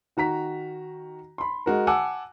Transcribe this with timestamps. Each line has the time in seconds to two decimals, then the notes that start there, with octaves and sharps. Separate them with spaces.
0.17 D#3 F#4 A#5 B6
1.38 B5 C6
1.66 G#3 F#4 A#4
1.87 F#5 G#5 A5 D6 E6